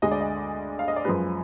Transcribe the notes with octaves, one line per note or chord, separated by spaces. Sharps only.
D2 D3 G#3 D#5
D5
D#5
F5
D#5
D5
F#2 F3 G#3 B4